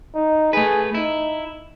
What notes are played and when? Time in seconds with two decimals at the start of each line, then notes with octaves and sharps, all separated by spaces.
0.15 D#4
0.53 A3 G#4 B4
0.94 D#4 E4